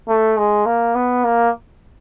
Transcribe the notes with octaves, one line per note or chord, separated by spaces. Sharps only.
A3
G#3
A#3
B3
A#3